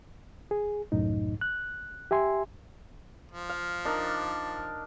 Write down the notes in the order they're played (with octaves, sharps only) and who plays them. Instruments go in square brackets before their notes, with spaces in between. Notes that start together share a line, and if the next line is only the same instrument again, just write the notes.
[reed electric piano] G#4
C2 F#2 A2 D#4
F#6
G4 E5 G#5 C6
[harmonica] F3
[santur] F5
[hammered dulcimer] D4 [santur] D#4 A#4